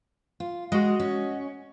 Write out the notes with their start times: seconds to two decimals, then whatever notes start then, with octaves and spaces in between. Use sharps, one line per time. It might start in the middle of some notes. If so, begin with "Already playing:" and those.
0.40 F4
0.72 G#3 F#4 D#5
1.00 C#4